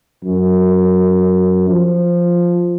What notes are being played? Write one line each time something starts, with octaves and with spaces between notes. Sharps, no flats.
F#2
F3